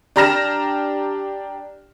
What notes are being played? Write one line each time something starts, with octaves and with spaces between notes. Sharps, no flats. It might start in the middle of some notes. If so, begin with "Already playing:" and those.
D4 G4 A#5 F6 A#6 E7